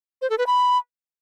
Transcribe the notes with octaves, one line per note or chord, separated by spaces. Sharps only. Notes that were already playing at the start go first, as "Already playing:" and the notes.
C5
A4
B4
B5